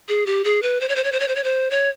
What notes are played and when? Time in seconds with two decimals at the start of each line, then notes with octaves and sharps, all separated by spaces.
0.09 G#4
0.26 G4
0.44 G#4
0.62 B4
0.81 C5
0.89 C#5
0.96 C5
1.04 C#5
1.12 C5
1.20 C#5
1.28 C5
1.36 C#5
1.44 C5
1.71 C#5